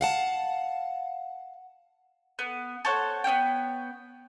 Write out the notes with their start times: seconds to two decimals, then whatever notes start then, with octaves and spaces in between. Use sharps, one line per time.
0.01 F5 F#5 A5
2.39 B3
2.85 A4 C5 C#5 F#5
3.24 B3 C#4 C#5 G5